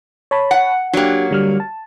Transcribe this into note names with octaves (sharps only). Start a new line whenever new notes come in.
C#5 A5 B5
F#5
F#3 A#3 D4 G4
D3 G3 F6
A5